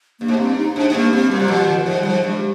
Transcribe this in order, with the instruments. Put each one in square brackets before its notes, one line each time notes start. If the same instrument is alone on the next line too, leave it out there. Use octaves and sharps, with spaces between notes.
[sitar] G2 [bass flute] A#3
[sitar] G#2
[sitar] G2 [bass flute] C4
[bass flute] D#4
[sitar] G#2 [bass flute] D4
[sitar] G#2
[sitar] G2 [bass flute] A#3
[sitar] G2 [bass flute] C4
[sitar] A#2 [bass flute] G3
[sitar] C3
[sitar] A#2 [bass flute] F3
[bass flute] D#3
[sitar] G#2 [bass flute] F3
[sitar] G#2 [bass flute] G3
[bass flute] F3
[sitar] G2 [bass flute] G#3